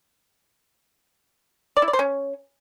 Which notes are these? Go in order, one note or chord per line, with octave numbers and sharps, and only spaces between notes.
D5
E4
D5
C5
C#4